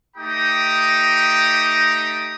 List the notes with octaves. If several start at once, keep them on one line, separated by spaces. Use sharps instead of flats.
A3 D#4 G4 G5 A#5 D#6